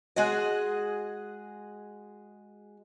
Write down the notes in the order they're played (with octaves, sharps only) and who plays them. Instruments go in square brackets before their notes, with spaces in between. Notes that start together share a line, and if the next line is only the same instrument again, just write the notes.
[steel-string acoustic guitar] G#3 F#4 G#4 D#5